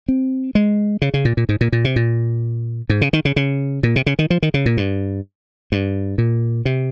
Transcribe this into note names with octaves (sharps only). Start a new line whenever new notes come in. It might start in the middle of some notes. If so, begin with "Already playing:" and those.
C4
G#3
C#3
C#3
A#2
A#2
G#2
A#2
A#2
C3
A#2
G#2
C#3
D#3
C#3
C#3
A#2
C3
C#3
D#3
F3
D#3
C#3
A#2
G2
G2
A#2
C3